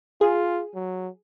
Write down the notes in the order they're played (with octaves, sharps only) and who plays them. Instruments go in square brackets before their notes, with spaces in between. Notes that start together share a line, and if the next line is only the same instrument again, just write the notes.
[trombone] F4 [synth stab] G#4
[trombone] F#3